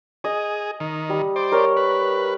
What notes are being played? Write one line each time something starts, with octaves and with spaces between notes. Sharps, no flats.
G#4 D#5
D#3
G3
C5 D5
A#4 C#5
B4